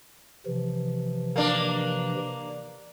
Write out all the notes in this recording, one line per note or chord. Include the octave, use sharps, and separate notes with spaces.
C3 E3 F3
A#3 D4